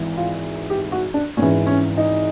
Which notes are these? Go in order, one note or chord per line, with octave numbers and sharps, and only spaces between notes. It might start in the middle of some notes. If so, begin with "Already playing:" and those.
Already playing: G#1 G#2 E3
F4
G4
F#4
D4
G#1 G#2 E3 C#4
C#4
D#4